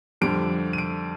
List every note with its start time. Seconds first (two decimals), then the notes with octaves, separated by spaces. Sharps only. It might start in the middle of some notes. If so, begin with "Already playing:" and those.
0.21 F2 D3 G3 D7
0.73 D#7
0.78 D7